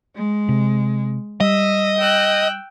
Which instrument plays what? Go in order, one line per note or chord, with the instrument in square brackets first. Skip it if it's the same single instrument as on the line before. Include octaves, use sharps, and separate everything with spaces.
[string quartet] G#3
[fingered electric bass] C3
[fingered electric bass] G3 [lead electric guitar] D#5 [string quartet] E5
[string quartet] G5 E6 F#6